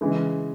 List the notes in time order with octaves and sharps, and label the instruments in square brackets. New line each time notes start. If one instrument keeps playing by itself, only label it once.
[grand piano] C#3 E3 G#3